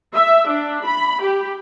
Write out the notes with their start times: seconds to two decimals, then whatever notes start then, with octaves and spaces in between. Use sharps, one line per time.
0.15 E5
0.49 D4
0.86 B5
1.22 G4